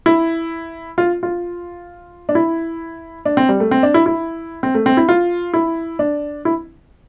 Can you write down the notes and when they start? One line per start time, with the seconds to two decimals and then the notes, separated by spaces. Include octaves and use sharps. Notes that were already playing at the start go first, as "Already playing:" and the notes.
0.06 E4
0.98 F4
1.23 F4
2.29 D4
2.35 E4
3.26 D4
3.37 C4
3.49 G3
3.60 A3
3.71 C4
3.83 D4
3.94 E4
4.06 E4
4.63 C4
4.75 A3
4.86 C4
4.97 E4
5.09 F4
5.54 E4
5.99 D4
6.45 E4